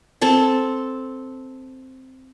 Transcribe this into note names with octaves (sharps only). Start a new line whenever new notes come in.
C4 A4 A5